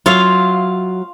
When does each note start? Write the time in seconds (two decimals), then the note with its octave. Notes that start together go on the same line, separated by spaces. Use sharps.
0.06 F#3 F4 C#5 E5 F5